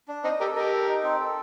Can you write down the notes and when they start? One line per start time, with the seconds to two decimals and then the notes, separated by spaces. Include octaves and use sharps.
0.08 D4
0.24 C4 D#4 D#5
0.40 G4 A4 A#4
0.56 G4 A#4 D#5
0.72 A4
0.88 D#4
1.04 C4
1.20 A4